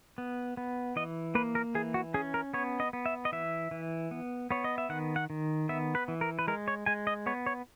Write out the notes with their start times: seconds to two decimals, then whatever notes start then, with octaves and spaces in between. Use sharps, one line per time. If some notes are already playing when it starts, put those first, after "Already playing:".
0.18 B3
0.57 B3
0.96 E3 D#5
1.35 A#3 B4
1.55 A#4
1.75 E3 G#4
1.94 F#4
2.14 C#4 G#4
2.34 A#4
2.54 B3 C#5
2.80 D#5
2.93 B3
3.06 E5
3.25 D#5
3.32 E3 E5
3.71 E3
4.11 B3
4.51 B3 C#5
4.64 D#5
4.78 E5
4.89 D#3 F#5
5.16 F#5
5.30 D#3
5.69 B3 E5
5.95 B4
6.08 E3
6.21 A#4
6.39 B4
6.48 G#3 A#4
6.68 C#5
6.86 G#3 G#5
7.07 D#5
7.26 B3 C#5
7.46 C#5